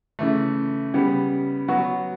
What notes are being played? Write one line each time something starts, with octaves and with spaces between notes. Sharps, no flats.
C#3 E3 A3
C#3 G3 B3
F#3 B3 F#4